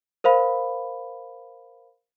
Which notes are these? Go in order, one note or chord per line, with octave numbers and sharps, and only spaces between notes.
A#4 C5 F5 B5